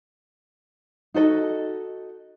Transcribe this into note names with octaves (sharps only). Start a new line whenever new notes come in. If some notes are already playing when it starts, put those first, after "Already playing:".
D#4 F#4 A4 D#5